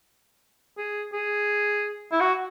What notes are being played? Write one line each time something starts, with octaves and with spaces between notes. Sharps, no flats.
G#4
G#4
E4
F#4